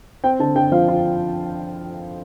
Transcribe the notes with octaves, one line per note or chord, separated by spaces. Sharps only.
C4 G5
D3 A5
D3 G5
F3 F5
F4